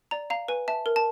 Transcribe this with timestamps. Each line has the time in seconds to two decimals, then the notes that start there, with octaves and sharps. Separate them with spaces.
0.11 D5 A#5
0.30 F5 A#5
0.48 B4 G#5
0.68 E5 A5
0.86 A#4
0.96 A5